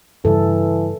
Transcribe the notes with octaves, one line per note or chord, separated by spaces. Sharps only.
G2 C#3 E3 G3 A4